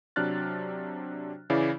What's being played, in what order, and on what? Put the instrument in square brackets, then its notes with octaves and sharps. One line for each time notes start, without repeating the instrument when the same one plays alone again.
[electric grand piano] C3 F#3 D4 F6 F#6 A6
C#3 E3 E4 D5 F5